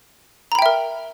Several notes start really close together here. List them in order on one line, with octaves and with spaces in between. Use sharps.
A#5 B5 G5 E5 A#4